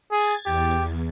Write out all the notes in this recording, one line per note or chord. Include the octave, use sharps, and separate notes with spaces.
G#4 G#6 A6
E2 G4